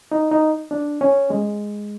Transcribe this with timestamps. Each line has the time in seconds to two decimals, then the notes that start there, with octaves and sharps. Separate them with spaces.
0.12 D#4
0.32 D#4
0.71 D4
1.01 C#4
1.30 G#3